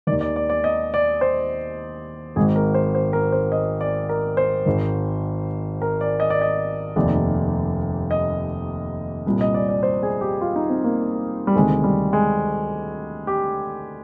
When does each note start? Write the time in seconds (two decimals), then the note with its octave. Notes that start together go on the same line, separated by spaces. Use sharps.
0.07 D#3 D5
0.12 D#2
0.21 D5
0.36 D5
0.49 D5
0.64 D#5
0.94 D5
1.21 C5
2.36 G#1 G#2 D#3 G#4
2.56 A#4
2.74 C5
2.95 C5
3.13 A#4
3.32 C5
3.52 D#5
3.81 D5
4.09 A#4
4.37 C5
4.66 G#1 G#2 D#3
5.82 A#4
6.01 D5
6.20 D#5
6.30 D5
6.42 D#5
6.96 F1 D#2 D#3 D5
8.11 D#5
9.27 C2 A#2
9.41 D#5
9.54 D5
9.69 D5
9.83 C5
10.03 G#4
10.21 G4
10.41 F4
10.56 D#4
10.69 C4
10.84 A#3
11.47 G3
11.56 D2 C3 D#3 G#3
11.84 G3
12.13 G#3
13.27 G4